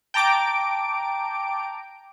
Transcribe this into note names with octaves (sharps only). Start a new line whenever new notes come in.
G5 A5 A#5 D6 D7